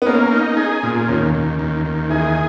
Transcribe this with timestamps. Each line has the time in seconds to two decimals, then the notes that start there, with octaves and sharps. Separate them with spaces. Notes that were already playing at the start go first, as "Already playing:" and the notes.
0.02 B3
0.06 A#3 C#4
0.32 D#4
0.57 G#4
0.83 A#2
1.09 D#2 C#4
1.34 D#2
1.59 D#2
1.85 D#2
2.03 D#4
2.10 E3 E4 G#4